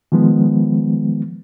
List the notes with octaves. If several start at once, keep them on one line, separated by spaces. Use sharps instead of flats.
D#3 F3 G#3 B3